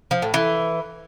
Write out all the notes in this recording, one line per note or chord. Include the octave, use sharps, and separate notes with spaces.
F3
A2
E3